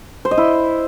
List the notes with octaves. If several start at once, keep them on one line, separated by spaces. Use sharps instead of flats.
C5
D#5
E4